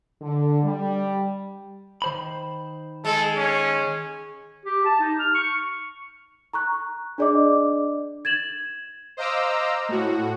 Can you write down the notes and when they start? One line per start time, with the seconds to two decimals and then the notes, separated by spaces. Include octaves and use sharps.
0.22 D3
0.63 G3
2.02 D#3 C5 B5
3.05 G#3 A4
3.37 C#4
4.65 G4
4.85 A5
5.00 D#4
5.19 F6
5.35 C#6
6.53 A#5 C#6 F#6
7.18 D4 G#4 D5 D#5 D6
8.25 G#6 A6 E7 F#7
9.17 C5 D#5 F5 A#5 D6 E6
9.89 A2 F#4